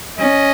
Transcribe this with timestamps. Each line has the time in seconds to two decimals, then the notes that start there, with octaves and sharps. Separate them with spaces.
0.18 C#4 D#5